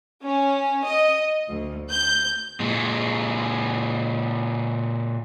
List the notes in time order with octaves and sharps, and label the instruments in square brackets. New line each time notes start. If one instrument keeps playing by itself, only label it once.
[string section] C#4
D#5
D2
G6
[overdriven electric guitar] A#2 G#3